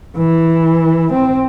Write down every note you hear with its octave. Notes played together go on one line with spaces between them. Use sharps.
E3
C4